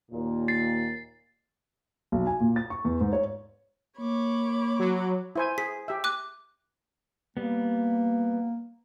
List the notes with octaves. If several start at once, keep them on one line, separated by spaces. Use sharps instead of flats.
D#2 A#2
A6 C7
B1
G#5
A#2
A6
C#6
E2
G#2
C#5
A#3 C#5 B5 D6
F#3
E4 C5 G#5
G#4 B6
G4 E5
D6 F#6
G3 A#3 B3